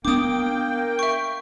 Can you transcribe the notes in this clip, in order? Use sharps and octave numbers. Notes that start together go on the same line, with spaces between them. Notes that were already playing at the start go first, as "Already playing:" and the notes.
A#3 B3 D4 G5 D6 D#6
E5 C#6